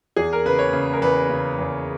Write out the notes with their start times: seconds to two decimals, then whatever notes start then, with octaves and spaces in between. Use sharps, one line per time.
0.16 E2 G#4
0.33 A#4
0.45 C#3 B4
0.59 C#5
0.73 C#3
0.93 A#4
1.02 E2 B4
1.29 C#3
1.59 E2